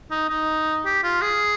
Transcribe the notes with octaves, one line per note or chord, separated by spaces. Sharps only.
D#4
D#4
G4
F4
G#4